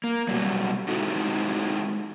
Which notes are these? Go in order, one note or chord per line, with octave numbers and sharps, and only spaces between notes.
A#3
B2 F#3 G3
G#3 C4 D#4 E4 F#4 A4